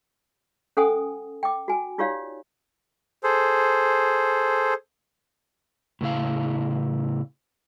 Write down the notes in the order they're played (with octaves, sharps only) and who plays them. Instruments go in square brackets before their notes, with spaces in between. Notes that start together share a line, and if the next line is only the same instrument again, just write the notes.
[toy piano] C#4 A4 C5 F#5 G#5 D#6
G5 D6
F#4 G#5
D#4 F4 G4 C#5 D5 F5
[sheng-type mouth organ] G#4 A4 C5
[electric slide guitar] A2 C#3 E4 F5